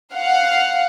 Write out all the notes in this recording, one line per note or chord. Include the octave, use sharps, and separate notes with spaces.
F5 F#5